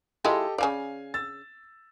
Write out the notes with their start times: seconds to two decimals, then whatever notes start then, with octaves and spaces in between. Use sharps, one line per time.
0.25 G#3 E4 F4 G4 A4 D#5
0.58 C#3 E3 D5 F5 G#5
1.14 E6 A6